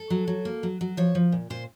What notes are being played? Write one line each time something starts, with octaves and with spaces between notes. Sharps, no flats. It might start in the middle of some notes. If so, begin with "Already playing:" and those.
Already playing: A4
F#3
F#3
A#3
F#3
F#3
F3 C#5
F3
A#2
A#2 C5